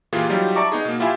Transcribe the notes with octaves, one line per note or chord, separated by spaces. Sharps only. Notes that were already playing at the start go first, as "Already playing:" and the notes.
A#2 E3 A#3 F4 G4 G#4
F#3 G3 D#4 F4 G4
D5 E5 A5 A#5 C#6 D6
B3 D#4 G#4
B2 A#3
E4 F4 G4 E5 G#5 B5